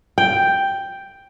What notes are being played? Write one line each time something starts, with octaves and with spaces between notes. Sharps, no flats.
G5